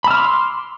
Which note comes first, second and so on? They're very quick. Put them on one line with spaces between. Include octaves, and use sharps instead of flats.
B5 E6 F6 D6 C6